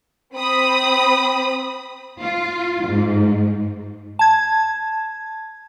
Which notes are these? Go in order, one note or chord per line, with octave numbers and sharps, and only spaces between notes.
C4 B5 D#6
F4
G#2
A5 G#6